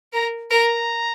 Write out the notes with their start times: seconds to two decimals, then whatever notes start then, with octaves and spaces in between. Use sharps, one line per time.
0.13 A#4 A#5
0.50 A#4 A#5